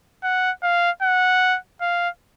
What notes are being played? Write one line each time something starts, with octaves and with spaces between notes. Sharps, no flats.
F#5
F5
F#5
F5